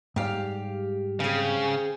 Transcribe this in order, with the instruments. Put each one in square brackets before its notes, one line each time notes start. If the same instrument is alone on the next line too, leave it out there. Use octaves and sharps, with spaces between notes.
[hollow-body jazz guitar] G#2 G3 [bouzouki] G4 F5
[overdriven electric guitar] C#3 [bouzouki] C4 G#4